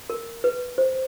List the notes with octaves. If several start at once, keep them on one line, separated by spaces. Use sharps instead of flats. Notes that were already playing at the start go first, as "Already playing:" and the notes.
A#4
B4
C5